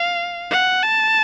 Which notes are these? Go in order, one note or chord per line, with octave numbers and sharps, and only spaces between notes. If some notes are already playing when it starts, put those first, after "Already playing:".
Already playing: F5
F#5
A5